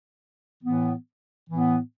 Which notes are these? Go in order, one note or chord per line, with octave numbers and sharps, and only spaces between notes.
A2 E3 B3
A2 E3 B3